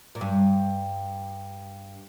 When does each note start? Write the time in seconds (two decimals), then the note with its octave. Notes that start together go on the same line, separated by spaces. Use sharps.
0.15 A#2
0.21 G2